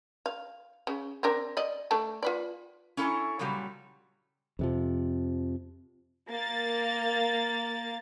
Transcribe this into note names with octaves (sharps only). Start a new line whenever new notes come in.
F5
C#3
C4 D4 A#4
D5 D#5
A3 D4 A5
F4 B4 D5
C#4 E4 A4 G5 G#5 A#5
A#2 C#3 F#3 G3
F2 C3 F3
A#3 A6